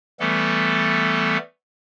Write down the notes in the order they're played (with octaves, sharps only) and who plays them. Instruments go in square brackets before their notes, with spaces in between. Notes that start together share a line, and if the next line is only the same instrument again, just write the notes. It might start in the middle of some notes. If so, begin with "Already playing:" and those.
[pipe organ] E3 G3 A3 B3 A4